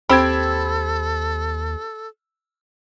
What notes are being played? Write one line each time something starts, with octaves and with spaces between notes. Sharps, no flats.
D#2 C4 G4 A4 B5 E6 G#6